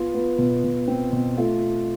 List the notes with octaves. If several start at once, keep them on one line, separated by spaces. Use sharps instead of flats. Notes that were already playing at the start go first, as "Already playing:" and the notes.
Already playing: B3 F4
B3
B2
B2
C4
B2
A3 F4